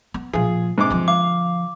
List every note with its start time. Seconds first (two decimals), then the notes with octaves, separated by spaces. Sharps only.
0.14 B3
0.33 A#2 F3 F4 G#4
0.78 G#2 C3 D6
0.90 D3 F3
1.08 F5 D6